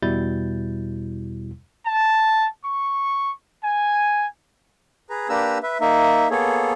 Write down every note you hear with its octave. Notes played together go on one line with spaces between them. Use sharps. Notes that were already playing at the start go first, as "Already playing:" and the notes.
E2 B2 G3 E4 G6 A6
A5
C#6
G#5
G#4 B4 A#5
A#3 D4 G4 B4 A#5 E6
B4 E5
A#3 D#4 E5
A#3 B3 G#4 A4 C#5